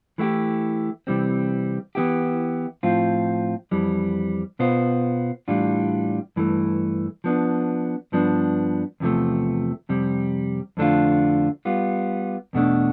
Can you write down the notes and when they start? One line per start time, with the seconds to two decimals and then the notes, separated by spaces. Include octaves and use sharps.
0.18 E3 A3 E4 G4
1.07 C3 E3 G3 C4
1.95 E3 B3 E4 G4
2.83 A2 F3 C4 F4
3.71 F2 E3 G3
4.59 B2 B3 F4 C5
5.48 A2 E3 G3 D4 F4
6.36 G2 E3 A3
7.24 F3 B3 D4
8.12 G2 F3 B3 D4
9.00 E2 C3 F3 A3
9.89 F2 C3 G3
10.77 F2 D3 A3 D4 F4
11.65 G3 B3 F4
12.53 E2 B2 A3 D4